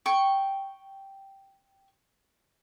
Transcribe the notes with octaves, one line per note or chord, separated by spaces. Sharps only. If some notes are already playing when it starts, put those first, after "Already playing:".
G5 C#6